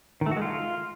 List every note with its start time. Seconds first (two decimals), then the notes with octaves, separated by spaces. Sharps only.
0.21 D#3
0.26 A3
0.31 F#4
0.37 G#3
0.42 F4